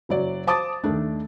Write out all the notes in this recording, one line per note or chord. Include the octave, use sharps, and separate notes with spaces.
F#1 F#3 D5
C5 A5 D6 D#6 A6
D#2 D#3 A3 D4